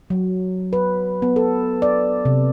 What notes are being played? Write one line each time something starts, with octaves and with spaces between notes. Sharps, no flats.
F#3
B4
B3
A4
D5
C3